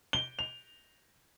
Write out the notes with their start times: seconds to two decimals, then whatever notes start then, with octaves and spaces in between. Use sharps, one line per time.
0.13 G7
0.39 F7